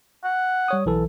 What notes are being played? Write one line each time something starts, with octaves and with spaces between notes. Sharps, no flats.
F#5
G3 C#5 D#6
B1 E3 A4